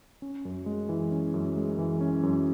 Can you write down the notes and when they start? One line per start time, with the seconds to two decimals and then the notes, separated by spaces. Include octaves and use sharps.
0.22 C#4
0.45 F#2
0.66 G#3
0.89 E3
1.11 C#4
1.34 F#2
1.57 G#3
1.78 E3
2.01 C#4
2.23 F#2